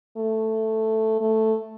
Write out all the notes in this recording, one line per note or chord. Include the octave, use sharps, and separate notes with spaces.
A3
A3